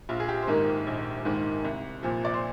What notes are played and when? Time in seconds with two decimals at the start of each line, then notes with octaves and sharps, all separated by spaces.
0.09 A#1 F4
0.20 G#4
0.28 G4
0.42 C5
0.48 G#2 D#3 A#3 A#4
0.87 A#1
1.25 G#2 D#3 A#3
1.64 C2
2.03 A#2 F3
2.25 D5
2.34 C5